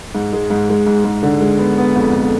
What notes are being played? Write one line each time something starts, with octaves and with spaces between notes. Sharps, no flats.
G#2
G#3
G#2
G#3
G#2
G#2
D3
G#3
B3
B3
F2
F2